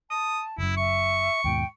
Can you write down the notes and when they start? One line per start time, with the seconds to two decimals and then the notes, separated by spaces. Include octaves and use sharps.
0.11 A5 D#6
0.58 F#1 F#2 E4
0.77 E5 C#6
1.44 D#2 G#2 B2 G5